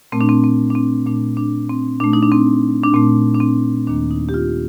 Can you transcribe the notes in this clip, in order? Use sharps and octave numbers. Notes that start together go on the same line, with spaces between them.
A#2 A3 C4
D4
C4
C4
D4
C4
A#2 A3 D4
D4
C4
A#2 A3 D4
D#4
D4
C4
D4
A#2 A3 C4
D4
C4
D#2 D#3 A#3 D4
D#4
G4
F4